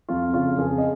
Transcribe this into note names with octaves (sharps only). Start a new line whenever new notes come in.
F2 F4
C#3 F4
F2 G#4
D#5